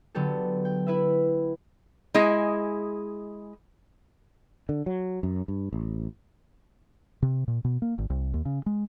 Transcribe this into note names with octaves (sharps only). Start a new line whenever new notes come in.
D3 F#3 B3 G4 A4
G5
E4 B4 E5
G#3 E4 G#4 D#5
D3
F#3
F#2
G2
A1
C3
A#2
B2
A#3
G#1
C2
D#2
C#3
G#3